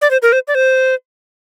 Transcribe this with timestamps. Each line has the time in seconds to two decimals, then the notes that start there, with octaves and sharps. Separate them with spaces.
0.01 D5
0.11 C5
0.22 A#4
0.32 C5
0.48 D5
0.55 C5